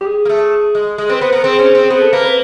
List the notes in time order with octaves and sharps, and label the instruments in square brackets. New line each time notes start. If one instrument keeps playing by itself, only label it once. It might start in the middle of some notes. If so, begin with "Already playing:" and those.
[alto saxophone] G4
G#4
[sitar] A#3
A3
G#3
[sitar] G#3 [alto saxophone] G#4
[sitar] C4 [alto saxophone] B4
[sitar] B3 [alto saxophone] B4
[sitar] B3 [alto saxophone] A#4
[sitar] C4 [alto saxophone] G#4
[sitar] C#4
C4
[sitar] B3 [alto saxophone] G#4
[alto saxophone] A4
[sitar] A#3 [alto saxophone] B4
[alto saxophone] B4